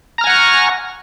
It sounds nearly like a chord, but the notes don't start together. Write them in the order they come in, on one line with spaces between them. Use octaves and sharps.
A#5 F6 G#5 F#5 C#6